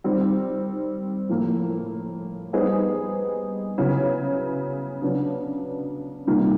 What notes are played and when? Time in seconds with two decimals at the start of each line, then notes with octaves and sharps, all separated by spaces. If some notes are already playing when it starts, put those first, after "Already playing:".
0.04 D#3 G3 C4
1.29 A2 F3 A#3
2.53 G3 B3 D#4 G#4 C5
3.78 C#3 F#3 B3 E4
5.02 C#3 F#3 B3 D4
6.27 C3 D#3 G3 A#3